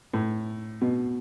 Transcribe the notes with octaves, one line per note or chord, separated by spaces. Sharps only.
A2
B2